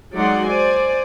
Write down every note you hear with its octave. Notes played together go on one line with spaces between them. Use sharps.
F#3 G#3 D#4 D5 F#5 C6
C5 D5 G#5